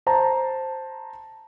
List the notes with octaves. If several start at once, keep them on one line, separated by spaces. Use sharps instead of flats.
C5 A5 A#5